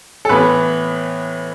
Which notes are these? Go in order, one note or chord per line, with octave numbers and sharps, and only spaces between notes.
A4
A2 E3 B3 B4